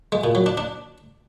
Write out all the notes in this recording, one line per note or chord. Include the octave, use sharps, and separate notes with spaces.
G#3
A#2
F#3
D4
D4